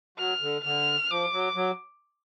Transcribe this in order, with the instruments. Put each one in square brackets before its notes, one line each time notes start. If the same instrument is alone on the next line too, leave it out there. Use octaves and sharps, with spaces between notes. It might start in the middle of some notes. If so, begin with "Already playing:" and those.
[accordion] F#3 [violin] F6
[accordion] D3
[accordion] D3 [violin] F6
[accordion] F3 [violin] D6
[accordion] F#3
F#3